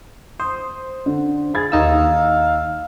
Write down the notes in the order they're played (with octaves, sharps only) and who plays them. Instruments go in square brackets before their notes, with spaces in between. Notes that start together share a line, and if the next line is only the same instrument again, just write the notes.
[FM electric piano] C5 [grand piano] D#6
[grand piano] D3
[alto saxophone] G#4 [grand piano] B5 G#6 A6
[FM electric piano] D#2 D#4 E6 [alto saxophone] F5